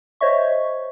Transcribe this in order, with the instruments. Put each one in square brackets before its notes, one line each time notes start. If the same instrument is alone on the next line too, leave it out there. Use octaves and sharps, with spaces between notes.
[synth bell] C5 C#5 D#5 E5 C#6